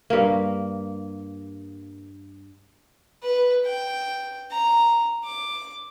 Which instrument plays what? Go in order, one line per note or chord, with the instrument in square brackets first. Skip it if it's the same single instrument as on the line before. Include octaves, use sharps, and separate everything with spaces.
[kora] G2 A#3
[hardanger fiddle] B4
G5
A#5
D6